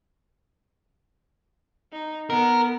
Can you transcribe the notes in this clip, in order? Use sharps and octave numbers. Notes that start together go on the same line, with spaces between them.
D#4
B3 A#4